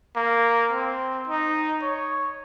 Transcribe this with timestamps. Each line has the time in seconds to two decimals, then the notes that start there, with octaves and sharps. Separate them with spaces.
0.16 A#3
0.72 C4
1.27 D#4
1.82 C#5